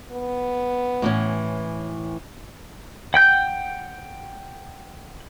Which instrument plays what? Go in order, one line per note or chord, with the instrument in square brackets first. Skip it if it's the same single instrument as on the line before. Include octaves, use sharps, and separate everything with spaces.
[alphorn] B3
[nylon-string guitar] A2 E3 C#4
[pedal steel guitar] F#5 G5 G6